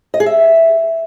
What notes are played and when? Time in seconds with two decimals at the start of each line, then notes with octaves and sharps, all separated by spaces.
0.14 D#5
0.20 G#4
0.26 E5